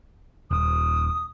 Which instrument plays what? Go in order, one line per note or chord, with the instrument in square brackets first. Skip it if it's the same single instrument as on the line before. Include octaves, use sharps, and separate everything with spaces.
[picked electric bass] D#1 [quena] D#6